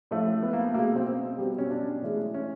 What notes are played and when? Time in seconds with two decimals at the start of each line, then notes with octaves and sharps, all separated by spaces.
0.11 A2 F3 A3
0.43 B3
0.53 A#3
0.74 B2 G#3 A#3
0.96 C4
1.06 C4
1.38 B2 G3
1.58 C#4
1.71 D4
2.02 A2 E3 G#3
2.34 C#4